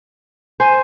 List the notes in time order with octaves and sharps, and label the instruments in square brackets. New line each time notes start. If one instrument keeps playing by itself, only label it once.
[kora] C5 [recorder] G#5